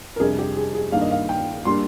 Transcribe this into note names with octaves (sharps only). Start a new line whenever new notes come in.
A#4
F2 C3 G3 D4 G#4
G4
G#4
G#4
G2 D#3 A#3 D4 F5
D#5
F5
G5
G3 A#3 D4 C6